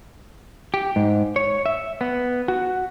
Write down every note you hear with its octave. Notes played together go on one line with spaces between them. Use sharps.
G4
G#2
C#5
E5
B3
F#4